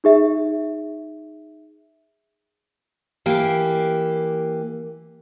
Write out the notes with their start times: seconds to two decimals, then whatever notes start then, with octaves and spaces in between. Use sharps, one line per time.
0.04 D#4 G#4 E5
3.26 E3 A#3 G4